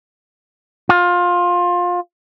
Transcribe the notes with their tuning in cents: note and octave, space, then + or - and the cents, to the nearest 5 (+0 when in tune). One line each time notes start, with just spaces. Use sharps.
F4 +20